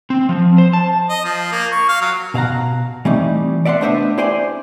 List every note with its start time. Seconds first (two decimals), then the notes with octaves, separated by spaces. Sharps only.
0.10 C4
0.29 F3
0.58 C5
0.73 A5
1.09 D#5
1.24 F3
1.52 A#3
1.72 C#6
1.88 F5
2.01 F#3
2.34 B2 F5 F#5 A#5
3.05 E3 G3 A3 C4 D#4
3.65 D5 E5 F#5 G5 C6
3.81 A3 B3 D4 C5 D#5 E5
4.18 E4 G4 C5 D5 G#5 C6